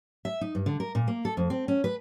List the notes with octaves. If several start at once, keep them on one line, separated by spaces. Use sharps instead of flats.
E5
D#4
G2
D3
A#4
A#2
A#3
A4
F2
C4
C#4
B4